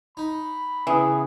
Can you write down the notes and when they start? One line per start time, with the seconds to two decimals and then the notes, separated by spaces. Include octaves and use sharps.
0.17 D#4 B5
0.87 C#3 E3 B3 G#4